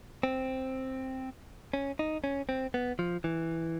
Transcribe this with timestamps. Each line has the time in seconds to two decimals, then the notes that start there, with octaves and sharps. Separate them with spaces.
0.23 C4
1.74 C#4
1.99 D#4
2.24 C#4
2.49 C4
2.74 B3
2.99 F3
3.24 E3